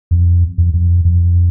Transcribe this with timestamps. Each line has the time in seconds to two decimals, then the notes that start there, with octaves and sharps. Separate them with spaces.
0.11 F2
0.58 F2
0.74 F2
1.05 F2